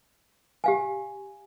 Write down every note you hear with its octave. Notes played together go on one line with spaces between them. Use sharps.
G4 F5 G#5